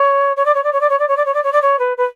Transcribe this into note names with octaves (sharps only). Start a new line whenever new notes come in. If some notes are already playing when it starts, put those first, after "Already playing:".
Already playing: C#5
C#5
D5
C#5
D5
C#5
D5
C#5
D5
C#5
D5
C#5
D5
C#5
D5
C#5
B4
B4